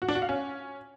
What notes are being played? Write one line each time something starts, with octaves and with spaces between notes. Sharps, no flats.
F#4
D4
F#4
F5
C#4